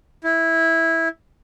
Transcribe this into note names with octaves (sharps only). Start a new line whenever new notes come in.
E4